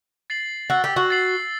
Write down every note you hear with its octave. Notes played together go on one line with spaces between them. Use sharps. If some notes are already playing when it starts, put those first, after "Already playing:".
A6 C7 F#7
F#4 E6
G4
F#4
A6 C7 F#7